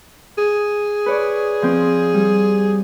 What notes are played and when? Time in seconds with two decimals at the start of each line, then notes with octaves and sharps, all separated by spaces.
0.38 G#4
1.06 B4 C#5 D5
1.62 F3 C4
2.14 G3